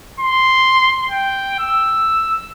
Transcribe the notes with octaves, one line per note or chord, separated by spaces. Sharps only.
C6
G5
E6